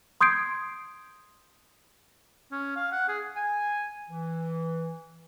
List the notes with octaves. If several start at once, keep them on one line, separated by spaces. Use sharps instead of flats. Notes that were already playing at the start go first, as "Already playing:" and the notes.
C6 D#6 G6 G#6 C7 D7
C#4
F5
F#5
G#4
G#5
E3